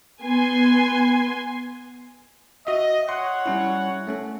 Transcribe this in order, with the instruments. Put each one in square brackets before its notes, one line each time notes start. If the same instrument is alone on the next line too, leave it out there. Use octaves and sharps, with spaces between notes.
[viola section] B3 G#5 C6
[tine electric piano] F#4 E5 [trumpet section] D#5
[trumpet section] C#5 F#5 [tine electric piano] C6
[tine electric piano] G3 C#4 E4
A3 C#4 A4